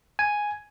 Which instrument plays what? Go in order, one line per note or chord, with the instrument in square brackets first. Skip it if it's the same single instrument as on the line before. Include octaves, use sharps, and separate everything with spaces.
[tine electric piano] G#5